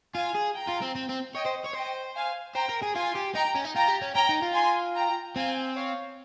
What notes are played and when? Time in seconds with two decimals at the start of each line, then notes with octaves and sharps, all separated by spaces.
0.15 F4 F5 G#5
0.35 G#4
0.55 G5 A#5
0.69 F4
0.82 C4
0.95 C4
1.09 C4
1.35 C#5 D#5 G5
1.46 C5
1.66 C#5
1.75 C5 D#5 G5
2.15 F5 G#5
2.55 C5 G5 A#5
2.69 A#4
2.82 G#4
2.95 F4 G#5 C6
3.15 G4
3.35 D#4 G5 A#5
3.55 C#4
3.65 D#4
3.75 F4 G5 A#5
3.88 G4
4.02 C#4
4.15 C#4 G5 A#5
4.29 D#4
4.42 F4
4.55 G#5 C6
4.95 G5 A#5
5.35 C4 F5 G#5
5.75 C#5 F5